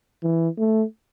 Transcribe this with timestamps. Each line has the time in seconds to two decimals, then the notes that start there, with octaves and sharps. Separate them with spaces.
0.23 E3
0.58 A3